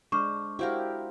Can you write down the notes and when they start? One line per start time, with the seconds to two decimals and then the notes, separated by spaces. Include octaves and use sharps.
0.12 G#3 D4 C5 C#6 D6 F6
0.59 E4 F#4 G4 A#4 C5 F5